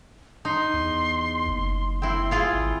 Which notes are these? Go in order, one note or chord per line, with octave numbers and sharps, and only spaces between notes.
D#4 C6
E2
F#1
C4 E4 C6
E4 F4 G#4
G#1